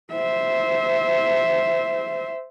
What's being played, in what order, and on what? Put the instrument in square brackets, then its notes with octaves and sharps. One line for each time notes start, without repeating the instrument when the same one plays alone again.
[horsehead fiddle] C5 E5